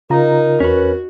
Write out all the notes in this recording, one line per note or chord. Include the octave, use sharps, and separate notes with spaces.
C#3 D#4 F4 A#4 A#5
E2 C#4 F#4 B4